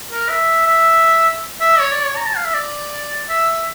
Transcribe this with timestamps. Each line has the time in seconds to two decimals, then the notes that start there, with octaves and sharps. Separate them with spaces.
0.11 A#4
0.30 E5
0.67 E5
1.61 E5
1.80 C#5
1.92 D5
2.05 C#5
2.16 A#5
2.26 A5
2.36 F5
2.45 E5
2.54 D5
3.29 E5